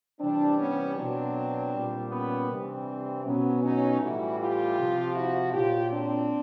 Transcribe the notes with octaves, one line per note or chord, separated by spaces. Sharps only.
C3 E3 G3 C4 D4
B3 C#4
B2 F#3 C4 D4
A#2 G3
B3 C#4
C3 E3 G3 C4 D4
B2 F#3 B3 C#4
C#4 D#4
A2 E3 G3 E4 F#4
F4 G4
C3 F3
E4 F#4
A#2 F#3 F4 G4
C4 D4